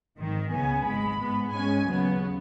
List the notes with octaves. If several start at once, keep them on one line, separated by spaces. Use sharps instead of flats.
G#1 G#2 D#3
C#2 C#3 B3 G#5
G#1 G#2 G#3 B5
G#2 G#3 B3
G#2 G#3 C#4 G#5
D#2 C#3 F#3 B3